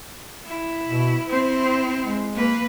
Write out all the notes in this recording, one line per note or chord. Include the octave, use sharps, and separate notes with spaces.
E4
B2
C4 E4 C5
G#3
A#3 B4